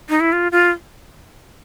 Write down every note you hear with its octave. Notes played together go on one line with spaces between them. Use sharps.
D#4
E4
F4
F4